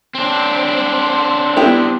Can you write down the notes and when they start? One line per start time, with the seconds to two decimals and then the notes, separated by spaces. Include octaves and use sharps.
0.15 C4 D4
1.57 B3 E4 G4